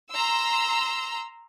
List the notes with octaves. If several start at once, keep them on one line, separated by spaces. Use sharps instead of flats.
A#5 C6 E6